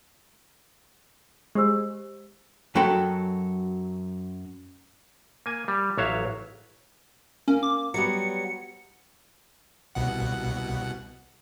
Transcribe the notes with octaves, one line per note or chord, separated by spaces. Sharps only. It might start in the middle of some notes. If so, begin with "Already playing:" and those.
G#3 G4 C5 E6
F#2 F#3 F#4 A4 G5 B5
A#3 G#5
G3
A1 F#3 C#5 E5 F5
A#3 C#4
D6
F#3 G3 B3 C#7
C2 B2 F#5